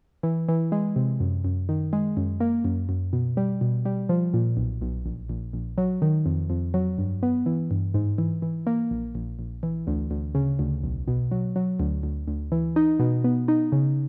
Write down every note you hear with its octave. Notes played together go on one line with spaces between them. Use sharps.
E3
E3
G#3
C3
F#2
F#2
D#3
G#3
F#2
A#3
F#2
F#2
B2
G3
B2
G3
F3
A#2
B1
B1
A#1
A#1
A#1
F#3
D#3
F2
F2
F#3
G2
B3
E3
G2
G#2
E3
E3
A#3
A#1
A#1
A#1
E3
D2
D2
C#3
D2
B1
B2
F#3
F#3
D2
D2
D2
E3
D#4
B2
B3
D#4
C#3